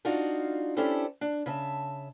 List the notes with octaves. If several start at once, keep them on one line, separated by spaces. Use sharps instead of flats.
D4 D#4 F4 F#4 F5
C#4 D4 E4 G4 A4 C5
D4
C#3 E5 A5